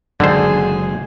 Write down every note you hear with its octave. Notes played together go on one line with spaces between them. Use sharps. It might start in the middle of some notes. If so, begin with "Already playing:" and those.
F#1 D3 D#3 F#3 G#3 G#4 C5